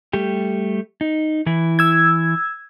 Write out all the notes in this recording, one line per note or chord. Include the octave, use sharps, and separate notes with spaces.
G3 A3 G4
D#4
E3 E4
E6 G#6